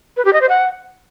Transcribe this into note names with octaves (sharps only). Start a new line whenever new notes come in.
B4
G4
D#5
C5
F#5